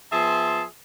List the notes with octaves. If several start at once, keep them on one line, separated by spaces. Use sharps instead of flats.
F3 B3 G#4 E5 A5 C6